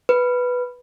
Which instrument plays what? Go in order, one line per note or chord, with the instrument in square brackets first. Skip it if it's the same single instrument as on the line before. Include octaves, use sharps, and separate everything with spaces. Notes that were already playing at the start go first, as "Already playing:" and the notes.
[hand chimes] B4